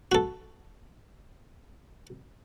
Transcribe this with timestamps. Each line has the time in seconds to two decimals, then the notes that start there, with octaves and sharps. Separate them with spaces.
0.12 F#4 A4